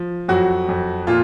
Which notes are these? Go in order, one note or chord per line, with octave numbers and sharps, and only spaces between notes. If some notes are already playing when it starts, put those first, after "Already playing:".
Already playing: F3
F2 F#3 F#4
F2
A#2 F4